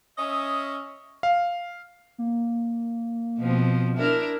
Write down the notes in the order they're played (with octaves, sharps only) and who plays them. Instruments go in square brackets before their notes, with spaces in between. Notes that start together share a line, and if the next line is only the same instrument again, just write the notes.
[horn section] C#4 D#5 E5 [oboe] D#6
[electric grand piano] F5
[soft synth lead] A#3
[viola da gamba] B2 F3 C4
D4 E4 A#4